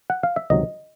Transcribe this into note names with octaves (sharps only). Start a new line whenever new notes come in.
F#5
F5
E5
C#2 C3 D#3 F#3 D#5